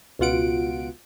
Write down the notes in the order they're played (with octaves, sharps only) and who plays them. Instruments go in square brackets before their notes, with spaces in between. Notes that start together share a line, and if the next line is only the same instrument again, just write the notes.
[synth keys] C#2 B2 F4 F#5 D7